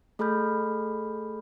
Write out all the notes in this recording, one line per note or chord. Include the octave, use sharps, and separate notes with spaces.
A3 G#4 A4 B5 F6 G6